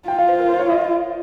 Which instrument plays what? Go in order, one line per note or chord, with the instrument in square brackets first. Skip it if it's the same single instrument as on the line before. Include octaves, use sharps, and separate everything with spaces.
[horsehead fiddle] F4 [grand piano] G5
[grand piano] F5
C5
A#4
C5
C#5
D#5